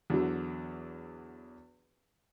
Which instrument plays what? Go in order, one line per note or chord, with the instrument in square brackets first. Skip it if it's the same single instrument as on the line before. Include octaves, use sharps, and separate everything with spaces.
[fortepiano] E2 D3 F#3